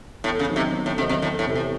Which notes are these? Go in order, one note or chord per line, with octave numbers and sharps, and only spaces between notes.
E2 A2
C#3
D#3 F#3 C4 D#4
C3
E2
A2
C3 D#3 F#3 C4 D#4
C3
E2 A2
A2
C3 E3 C4
A2